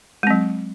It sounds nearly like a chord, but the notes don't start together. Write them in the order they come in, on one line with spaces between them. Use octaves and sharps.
G#3 C4 F#3